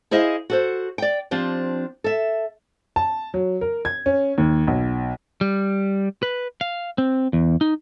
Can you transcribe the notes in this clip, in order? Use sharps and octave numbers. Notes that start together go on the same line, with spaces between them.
E4 G#4 C5 D#5 F5
F#4 A4 C5
D5 G5
F3 C4 D4 G4
A4 E5
A5
F#3
A#4
G#6
C#4
D#2
B1
G3
B4
F5
C4
E2
D#4